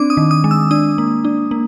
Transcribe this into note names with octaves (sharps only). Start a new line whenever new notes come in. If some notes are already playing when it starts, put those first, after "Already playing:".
Already playing: C4 D4 D6
D#6
D#3
D#6
G#3
E6
D4 D#6
A#3
D4
A#3